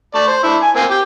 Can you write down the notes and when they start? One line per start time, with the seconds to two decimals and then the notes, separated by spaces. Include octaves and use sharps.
0.15 A3 D5 A5
0.27 C5
0.43 D4 E4
0.63 G#5
0.76 A#3 C4 G#5
0.91 G4 G5